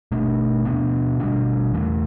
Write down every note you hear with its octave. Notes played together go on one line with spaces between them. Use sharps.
B2 A3 D4
B2 B3 D4
B2 G3 B3 D4
E2 E3 A3